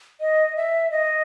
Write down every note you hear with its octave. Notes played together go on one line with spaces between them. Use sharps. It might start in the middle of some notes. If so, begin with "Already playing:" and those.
D#5
E5
D#5